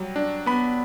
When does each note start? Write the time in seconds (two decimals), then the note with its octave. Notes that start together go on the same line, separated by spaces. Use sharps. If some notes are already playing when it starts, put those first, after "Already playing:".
Already playing: F#3 G3
0.16 D4
0.46 B3 B5